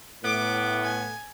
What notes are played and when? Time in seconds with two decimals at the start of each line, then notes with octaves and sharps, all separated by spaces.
0.24 A2 B3 D6
0.83 G#5